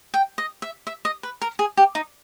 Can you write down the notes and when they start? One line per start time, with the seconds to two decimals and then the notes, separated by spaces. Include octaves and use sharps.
0.14 G5
0.38 D#5
0.62 E5
0.87 E5
1.05 D#5
1.23 B4
1.42 A#4
1.59 G#4
1.77 G4
1.95 D#4